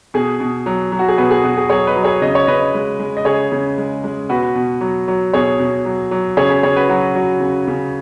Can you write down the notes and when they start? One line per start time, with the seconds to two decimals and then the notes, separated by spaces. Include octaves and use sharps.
0.14 B2 G#4
0.40 B2
0.66 F#3
0.92 F#3
0.99 F#4
1.08 G#4
1.18 B2 F#4 B4
1.31 G#4
1.44 B2 F#4
1.57 G#4
1.69 F#3 G#4 C#5
1.87 B4 D#5
1.96 F#3
2.04 G#4 C#5
2.22 C#3 D#5
2.35 C#5
2.47 C#3 B4 D#5
2.74 G#3
3.00 G#3
3.17 D#5
3.25 C#3 G#4 C#5
3.52 C#3
3.78 G#3
4.04 G#3
4.29 B2 F#4 B4
4.55 B2
4.81 F#3
5.08 F#3
5.33 B2 G#4 C#5
5.59 B2
5.85 F#3
6.11 F#3
6.37 C#3 G#4 C#5
6.50 G#4
6.63 C#3 G#4 C#5
6.76 F#4 B4
6.89 F#3 F#4
7.15 F#3
7.40 C#3
7.68 C#3